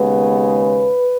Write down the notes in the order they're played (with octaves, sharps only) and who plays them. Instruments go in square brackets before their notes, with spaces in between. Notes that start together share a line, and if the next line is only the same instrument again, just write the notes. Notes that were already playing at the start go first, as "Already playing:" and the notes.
Already playing: [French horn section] D#2 C#3 G#3 B3 B4